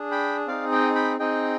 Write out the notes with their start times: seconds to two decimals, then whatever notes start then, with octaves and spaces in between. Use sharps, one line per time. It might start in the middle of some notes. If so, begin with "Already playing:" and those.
Already playing: D4 G#4
0.11 G5 B5
0.47 C4 D#4 G#4 D5 F5
0.72 D#5 G5
0.95 G5 B5
1.19 C4 D#4 G#4 D#5 G5